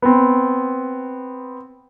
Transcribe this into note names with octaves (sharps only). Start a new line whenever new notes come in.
B3 C4